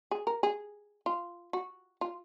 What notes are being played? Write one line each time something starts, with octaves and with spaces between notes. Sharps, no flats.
G#4
A#4
G#4
F4
F#4
F4